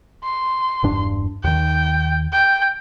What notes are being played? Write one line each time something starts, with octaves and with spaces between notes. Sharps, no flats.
C6
E1 G2 D4
D#2 D#3 G5
G5